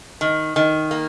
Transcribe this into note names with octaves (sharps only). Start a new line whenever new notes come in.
D#3
D#3
A#3